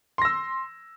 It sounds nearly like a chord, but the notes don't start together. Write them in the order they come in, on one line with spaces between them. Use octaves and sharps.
C6 A#6 E6